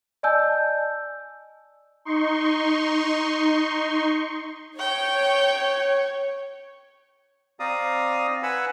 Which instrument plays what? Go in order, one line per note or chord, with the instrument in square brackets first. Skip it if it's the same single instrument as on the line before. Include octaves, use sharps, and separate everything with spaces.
[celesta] D5 D#5 G#5 A5 E6 G6
[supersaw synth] D#4 C6 C#6
[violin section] C#5 [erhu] G5
[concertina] C4 D5 F5 A#5 D#6
B4 F#5 G#5 B5 E6